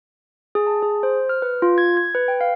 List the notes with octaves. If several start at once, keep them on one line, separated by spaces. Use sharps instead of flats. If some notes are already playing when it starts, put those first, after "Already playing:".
G#4
A5
G#4
C5
F6
B4
F4
G#6
G#6
B4
G5
F5